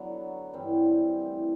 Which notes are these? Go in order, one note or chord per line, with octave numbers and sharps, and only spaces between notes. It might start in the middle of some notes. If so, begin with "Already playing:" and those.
Already playing: D3 F#3 B3
G2 E3 G3 C4
C3 E3 A3